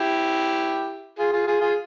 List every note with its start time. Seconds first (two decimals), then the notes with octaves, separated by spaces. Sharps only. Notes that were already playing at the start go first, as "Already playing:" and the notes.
Already playing: E4 G4
1.18 F4 G#4
1.32 F4 G#4
1.47 F4 G#4
1.61 F4 G#4